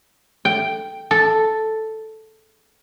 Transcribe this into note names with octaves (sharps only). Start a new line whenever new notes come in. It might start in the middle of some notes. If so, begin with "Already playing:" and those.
G5
A4